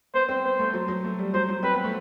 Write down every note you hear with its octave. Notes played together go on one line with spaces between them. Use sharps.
B3 C5
C4
B3 C5
A3
F#3
F#3
A3
G3
F#3 C5
F#3
C4 B4
B3
A3